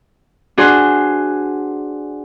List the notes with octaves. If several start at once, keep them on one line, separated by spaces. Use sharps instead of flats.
D4 F#4 G#4 C5